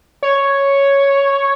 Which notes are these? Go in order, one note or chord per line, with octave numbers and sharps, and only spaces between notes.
C#5